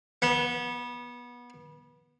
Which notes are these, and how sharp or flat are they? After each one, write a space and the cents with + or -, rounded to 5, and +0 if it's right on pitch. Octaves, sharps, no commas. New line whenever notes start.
B3 -25